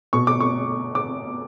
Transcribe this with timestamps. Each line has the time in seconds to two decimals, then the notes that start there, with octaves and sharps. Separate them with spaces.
0.13 B2 C#6
0.27 D6
0.40 C#6
0.95 D6